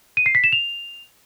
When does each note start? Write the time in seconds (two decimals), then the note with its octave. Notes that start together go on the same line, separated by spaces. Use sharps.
0.17 D#7
0.26 C7
0.35 B6
0.44 E7
0.52 F7